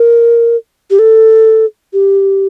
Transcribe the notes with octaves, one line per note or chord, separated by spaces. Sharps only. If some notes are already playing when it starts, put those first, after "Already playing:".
Already playing: A#4
G4
A4
G4